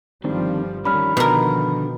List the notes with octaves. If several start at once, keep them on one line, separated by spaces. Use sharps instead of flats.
G1 D#3 F3 G3 C4 D4
D#3 F3 G3 C#4 D4 B5 F6
B2 D3 A#4